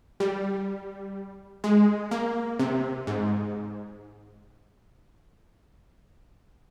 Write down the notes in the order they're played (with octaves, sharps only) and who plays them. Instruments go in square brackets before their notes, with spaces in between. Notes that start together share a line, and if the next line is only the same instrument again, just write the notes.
[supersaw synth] G3
G#3
A#3
C3
G#2